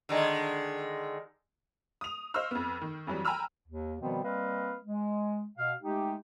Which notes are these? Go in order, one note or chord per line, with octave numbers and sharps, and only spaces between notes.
D3 D#3 G#3
D#6 F7
C5 D#5 F5 C#6 E6 F6
F2 B3
D#3
F2 E3 F#3 G3
G5 G#5 A#5 B5 E6 F6
D#2
B2 D#3 F3 G3 B3 C4
G3 A#3 C4 B4 D#5 F5
G#3
B2 F5
G#3 A3 D#4 G4